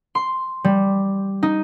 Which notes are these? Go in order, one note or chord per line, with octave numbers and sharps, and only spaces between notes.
C6
G3
D#4